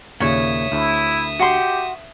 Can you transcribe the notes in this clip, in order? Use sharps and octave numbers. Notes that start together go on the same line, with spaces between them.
D#2 A#2 C#3 C#5 E5 D#6
D2 E4
F#4 G4 C6